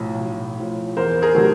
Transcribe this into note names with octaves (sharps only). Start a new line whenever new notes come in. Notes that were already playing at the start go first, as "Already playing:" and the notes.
Already playing: B1 A2 F3
B1
A2 F3
E2 A#4 C5
G#4 A#4
C3 D#3 F#3 A3